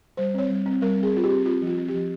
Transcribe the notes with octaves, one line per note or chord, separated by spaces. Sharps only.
G3 C5
C4 C#5
G3
C4
G3 A#4
C4
G#4
C4 F4
G4
C4
C4 F4
F3
F4
C4
G4
F3